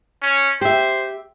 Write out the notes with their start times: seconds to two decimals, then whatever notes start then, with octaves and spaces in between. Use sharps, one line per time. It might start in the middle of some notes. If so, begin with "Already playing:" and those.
0.22 C#4
0.61 G4 C5 E5